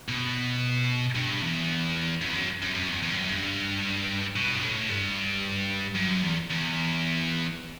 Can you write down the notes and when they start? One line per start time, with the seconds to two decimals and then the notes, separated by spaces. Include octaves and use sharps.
0.09 B2
1.15 G2
1.42 E2
2.22 F#2
2.29 E2
2.35 F#2
2.62 F#2
2.75 F#2
2.89 E2
3.03 E2
3.10 G2
3.16 F#2
3.29 G2
4.36 B2
4.53 G2
4.63 A2
4.89 G2
5.95 F#2
6.22 E2
6.50 E2